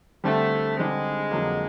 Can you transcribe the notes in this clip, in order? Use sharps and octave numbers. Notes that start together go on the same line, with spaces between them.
D3 G3 A3 C4
D3 G3 G#3 C4
F2 D3 F#3 A#3